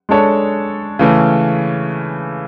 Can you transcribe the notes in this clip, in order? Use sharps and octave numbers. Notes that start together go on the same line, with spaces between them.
G#3 D4 A4 C#5
C#3 E3 A3 C#4